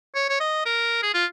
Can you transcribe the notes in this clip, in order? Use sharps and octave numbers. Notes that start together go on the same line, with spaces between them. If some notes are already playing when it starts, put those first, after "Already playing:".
C#5
C#5
D#5
A#4
G#4
F4